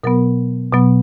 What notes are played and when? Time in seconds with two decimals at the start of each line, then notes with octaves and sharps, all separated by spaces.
0.04 B2 F#3 B3 A#4
0.73 B2 F#3 B3